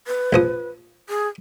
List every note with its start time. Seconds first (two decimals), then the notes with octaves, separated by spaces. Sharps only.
0.07 B4
0.33 A#1 F3 D#6
1.09 G#4